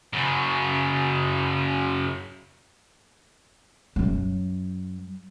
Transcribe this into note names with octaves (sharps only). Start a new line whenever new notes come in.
F#2 C#3
F#2 F#3